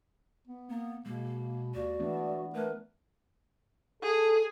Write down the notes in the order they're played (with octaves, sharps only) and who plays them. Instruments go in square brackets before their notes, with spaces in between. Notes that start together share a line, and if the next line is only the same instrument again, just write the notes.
[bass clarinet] B3
[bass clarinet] A#3 [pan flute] B3
[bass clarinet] B2 [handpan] G#3 [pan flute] A#3
[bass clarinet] D#2 [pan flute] F#4 [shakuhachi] D5
[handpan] E3 B3 D4 [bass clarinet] A3
[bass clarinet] A3 [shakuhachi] A#4 [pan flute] B4
[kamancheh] G#4 [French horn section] A4